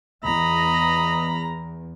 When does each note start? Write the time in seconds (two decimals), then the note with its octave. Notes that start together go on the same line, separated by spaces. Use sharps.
0.24 E2 D#5 A#5 B5